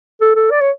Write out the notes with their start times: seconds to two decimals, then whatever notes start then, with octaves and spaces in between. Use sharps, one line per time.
0.21 A4
0.36 A4
0.51 D5
0.61 C#5